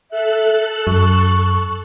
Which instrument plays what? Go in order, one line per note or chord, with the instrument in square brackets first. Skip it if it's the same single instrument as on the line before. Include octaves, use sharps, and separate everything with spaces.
[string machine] A4 F#6 [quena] E5
[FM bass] F#2 [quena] C#6